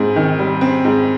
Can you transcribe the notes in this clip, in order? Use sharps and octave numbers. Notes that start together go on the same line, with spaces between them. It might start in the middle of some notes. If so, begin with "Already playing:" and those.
Already playing: G#2 C4
D#3
G3
C4
G#2